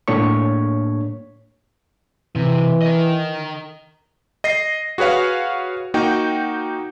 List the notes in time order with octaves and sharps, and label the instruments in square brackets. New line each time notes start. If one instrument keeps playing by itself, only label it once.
[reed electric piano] A2 A#3 D4 C#5 C#6
[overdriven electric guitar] C3 [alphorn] E3
[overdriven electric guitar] A#4 D#5
[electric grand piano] D#5 A#6 C7
F#4 G#4 B4 C#5 F5
A#3 D#4 F#4 G5